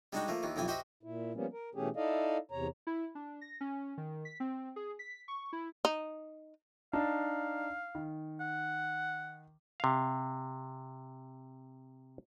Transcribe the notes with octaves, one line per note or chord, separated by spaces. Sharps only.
G3 G#3 D4 D#4 F#4 G4
F3 A3 A#3
D#2 D#3 E3
B1 F2 E3 G4 G#5
F#4 G4 C5 D#5 E5 B5
A#2 E4
F3 G3 A#3 B3 C#4
A#4
B2 E3 A3 C#4 G4 G#4
D#4 E4 A4 D5 D#5 F5
E2 C3 C#5 A#5
E4
D4
A#6
C#4
D#3
B6
C4
G#4
B6
C#6
E4
D#4
D4 D#4 F5 A5
D#3
F#5
C3 F5